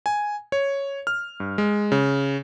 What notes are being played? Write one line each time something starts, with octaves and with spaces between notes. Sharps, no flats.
G#5
C#5
F6
G2
G#3
C#3